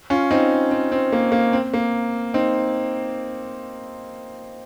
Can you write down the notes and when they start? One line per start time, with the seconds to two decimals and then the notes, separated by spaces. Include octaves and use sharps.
0.10 C#4 F4
0.31 C4 D#4
0.71 C4
0.92 C4
1.12 A#3
1.32 A#3
1.53 C4
1.74 A#3
2.34 C4 D#4